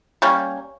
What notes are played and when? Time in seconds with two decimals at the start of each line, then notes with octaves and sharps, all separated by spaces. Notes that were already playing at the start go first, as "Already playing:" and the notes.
0.22 G3 A#3 C#4